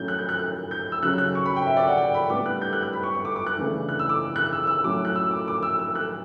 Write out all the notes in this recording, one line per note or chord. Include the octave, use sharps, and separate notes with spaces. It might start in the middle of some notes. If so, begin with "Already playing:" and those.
Already playing: A2 F#3 C#4 G6
F#6
G6
F#6
F#6
G6
E6
C#3 F#3 C#4 F#6
F#6
C#6
B5
G5
E5
D5
F#5
G5
B5
A2 G3 B3 D4 D6
F#6
G6
F#6
F#6
B5
C#6
C#6
D6
D6
F#6
C#3 E3 A3 D4
F#6
E6
D6
F#6
E6
E6
A2 F#3 C#4 D6
F#6
E6
D6
D6
E6
E6
F#6